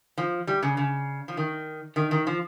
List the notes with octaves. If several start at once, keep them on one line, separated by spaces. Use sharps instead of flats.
F3
G3
C#3
C#3
F3
D#3
D#3
D#3
F3